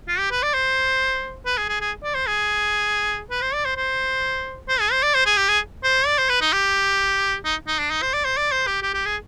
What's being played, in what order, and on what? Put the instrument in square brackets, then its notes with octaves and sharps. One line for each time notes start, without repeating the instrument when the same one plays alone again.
[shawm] F4
G4
B4
D5
C5
B4
G#4
G#4
G#4
D5
C5
G#4
B4
C5
D5
C5
C5
C5
G#4
C5
D5
C5
G#4
G4
G#4
C5
D5
C5
B4
D#4
G4
D#4
D#4
D4
D#4
C5
D5
C5
D5
C5
G4
G4
G4
G#4